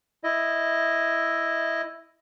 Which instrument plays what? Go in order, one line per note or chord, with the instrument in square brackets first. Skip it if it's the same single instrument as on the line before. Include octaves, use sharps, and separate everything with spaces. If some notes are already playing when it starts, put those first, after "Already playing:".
[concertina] E4 D#5